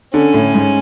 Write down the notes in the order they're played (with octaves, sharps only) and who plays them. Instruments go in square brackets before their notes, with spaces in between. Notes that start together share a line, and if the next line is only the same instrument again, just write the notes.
[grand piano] D3 [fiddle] C#4
[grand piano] A2
G#2